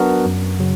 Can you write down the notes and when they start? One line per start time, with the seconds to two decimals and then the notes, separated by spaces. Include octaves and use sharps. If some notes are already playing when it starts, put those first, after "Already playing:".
Already playing: F#3 B3 D4 F#4 A#4
0.26 F#2
0.59 C#3 F#3